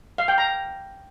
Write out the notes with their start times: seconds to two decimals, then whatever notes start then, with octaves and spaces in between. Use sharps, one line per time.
0.18 F5
0.28 G5
0.38 A#5